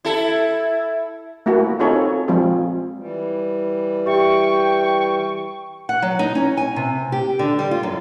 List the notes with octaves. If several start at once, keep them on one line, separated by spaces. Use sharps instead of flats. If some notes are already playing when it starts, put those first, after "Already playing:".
E4 A4
A3 A#3 E4 F#4
C4 D#4 F4 G#4 A4 C#5
F3 G#3 C4 F4 G#4
E3 G3
G4 E5 G5 C#6
F#5
F#3
D#4
C#4
G#5
C3
G4
D3
G3
F4
F#2